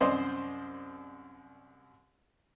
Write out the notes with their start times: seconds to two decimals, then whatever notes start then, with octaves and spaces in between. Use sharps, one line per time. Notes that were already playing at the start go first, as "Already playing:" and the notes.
0.01 C2 F#2 C5 D5 D#5 C6